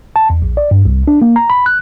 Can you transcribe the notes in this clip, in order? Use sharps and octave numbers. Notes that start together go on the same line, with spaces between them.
A5
E2
A#1
D5
G2
C2
D4
A#3
A#5
B5
F#6